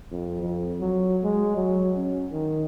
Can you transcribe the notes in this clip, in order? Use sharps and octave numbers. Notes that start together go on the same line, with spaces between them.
F2
F2
F#3
G#3
F#3
C#4
D#3